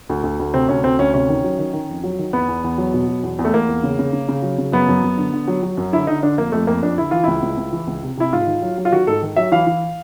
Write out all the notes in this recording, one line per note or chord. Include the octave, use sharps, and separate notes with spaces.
D2
D2
D2
C3 C4
D2 C#4
D2 C4
D2 C#4
C3 C#4
D#3
F#3
D#3
D#3
F2
F#3
D#3
E2 B3
E2
E2
F#3
B2
F#3
E2
E2
A3
E2 A#3
E2
C#3
C#3
C#3
C#3
F#3
C#3
F#2 B3
F#2
F#2
D3
D3
F#3
F#3
F#2
D3 E4
D3 D#4
D3 D4
F2 A#3
F2 A3
F2 A#3
F2 D4
D3 E4
E3 F4
C#2 E4
C#2
C#2
E3
C#2
C3
C3 E4
G#2 F4
D#3
F#3
F#3
F4
D#3 F#4
G#2 A4
D#3
F#3 E5
E3 F5
E3